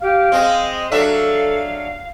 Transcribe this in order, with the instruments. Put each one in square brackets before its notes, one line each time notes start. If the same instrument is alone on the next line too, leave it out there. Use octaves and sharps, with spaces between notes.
[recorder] G4 [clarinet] F5
[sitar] G#3 C4 [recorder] D#5
[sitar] F#3 D4 E5 [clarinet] A4 [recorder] F5